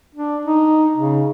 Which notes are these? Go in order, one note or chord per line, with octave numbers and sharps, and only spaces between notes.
D4
D#4
C#3